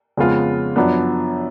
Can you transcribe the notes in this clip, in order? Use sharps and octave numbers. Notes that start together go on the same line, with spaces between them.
F2 C#3 G#3 B3 F4
F#2 F3 B3 D4